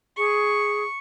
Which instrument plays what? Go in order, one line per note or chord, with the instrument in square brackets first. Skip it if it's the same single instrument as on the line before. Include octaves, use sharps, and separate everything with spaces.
[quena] G#4 [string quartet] C#6